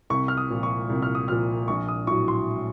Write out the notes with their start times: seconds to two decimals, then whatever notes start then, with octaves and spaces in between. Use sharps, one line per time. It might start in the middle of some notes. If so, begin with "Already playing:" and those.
0.10 C2 C#6
0.28 F6
0.37 D#6
0.50 A#2 F3
0.63 C#6
0.89 C2
1.02 F6
1.15 D#6
1.28 A#2 F3 F6
1.68 A#1 C#6
1.88 D#6
2.07 A2 F#3 C#6
2.28 C6